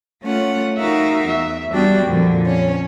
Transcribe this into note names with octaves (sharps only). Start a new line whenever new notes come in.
A3 C#4 F4 F#5
D#4 F#4 A#4 E5 F5
E2 E5
G3 B3 D4 F#4 G4 G5
F2 A#2 D3
C#4 C#5